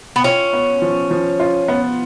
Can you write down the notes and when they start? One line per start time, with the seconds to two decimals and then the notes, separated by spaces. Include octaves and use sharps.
0.16 B3
0.24 C#4 F4
0.53 B3
0.82 F3
1.11 F3
1.40 F4
1.68 B3